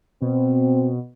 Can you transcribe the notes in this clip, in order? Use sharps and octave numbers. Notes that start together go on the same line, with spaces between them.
B2 C4